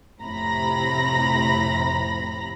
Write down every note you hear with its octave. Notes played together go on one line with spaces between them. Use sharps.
F2 A2 C3 A#5 B5 A#6